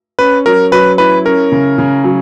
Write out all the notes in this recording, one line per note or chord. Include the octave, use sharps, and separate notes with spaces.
C#4 B4
F#3 A#4
F#3 B4
E4 B4
C#4 A#4
C#3
C#3
F#3